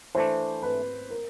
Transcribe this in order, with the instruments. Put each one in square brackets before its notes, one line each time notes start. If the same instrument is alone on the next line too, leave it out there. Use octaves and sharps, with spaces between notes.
[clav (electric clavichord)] E3 A3 D4 [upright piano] C5
[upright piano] B4
A#4